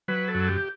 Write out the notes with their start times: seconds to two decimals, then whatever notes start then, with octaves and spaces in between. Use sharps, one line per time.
0.08 F#3 B4
0.28 A4
0.35 F#2
0.48 G4